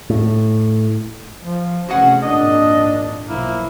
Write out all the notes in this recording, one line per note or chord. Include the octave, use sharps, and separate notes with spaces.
A2
F3
C3 E3 A3 C#4 F#4 G#4 F#5
G#1 F2 A#2 D4 D#5
B1 F3 A#3 E4